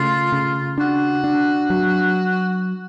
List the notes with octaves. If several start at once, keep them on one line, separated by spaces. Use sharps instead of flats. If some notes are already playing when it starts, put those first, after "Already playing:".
Already playing: C#3 A3 F4
C#3
D4 F#4
D4
F#3